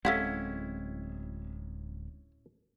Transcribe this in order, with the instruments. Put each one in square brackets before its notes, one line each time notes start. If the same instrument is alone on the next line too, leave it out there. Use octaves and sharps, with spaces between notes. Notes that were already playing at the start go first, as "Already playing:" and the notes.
[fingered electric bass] D1 G#3 C4 [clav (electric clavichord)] C#4 E4 [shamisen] A4 F5 F#5